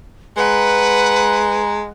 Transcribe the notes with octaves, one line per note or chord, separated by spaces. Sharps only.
G#3 B4 F#5 A#5